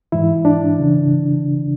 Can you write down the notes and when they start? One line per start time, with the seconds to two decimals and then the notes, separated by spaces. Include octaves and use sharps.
0.12 G#2 E3 E4
0.45 D4
0.80 C#3 E3